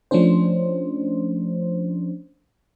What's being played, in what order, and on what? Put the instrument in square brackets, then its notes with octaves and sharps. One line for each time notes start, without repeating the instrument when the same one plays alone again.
[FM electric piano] F3 A3 C#4 D4 C5